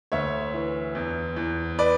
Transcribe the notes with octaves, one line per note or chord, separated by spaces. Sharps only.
D2 C#5 E5
E3
E2
E2
B4 D5